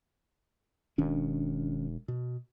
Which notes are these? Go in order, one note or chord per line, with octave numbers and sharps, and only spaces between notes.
E1 D#3 C#4 D4
B2